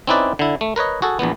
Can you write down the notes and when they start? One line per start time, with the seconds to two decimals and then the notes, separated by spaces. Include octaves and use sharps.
0.07 C4 C#4 D#4 E4 B4 D5
0.39 D3 E4
0.61 A3
0.76 A#4 B4 C#5 D#5
1.02 F#4 G#4 A4
1.19 A#1 E2 A#2 B3